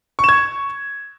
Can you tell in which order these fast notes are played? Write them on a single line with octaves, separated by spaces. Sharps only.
C#6 E7 G#6